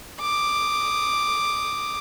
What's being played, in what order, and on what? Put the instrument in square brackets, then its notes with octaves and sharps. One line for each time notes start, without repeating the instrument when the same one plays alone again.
[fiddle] D6 D#6